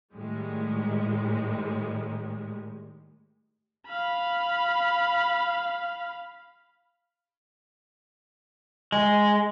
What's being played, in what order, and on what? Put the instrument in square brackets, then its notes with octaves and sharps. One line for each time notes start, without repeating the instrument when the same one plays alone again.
[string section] A2 D#3 G3 G#3
[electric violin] F5 B5
[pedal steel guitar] G#3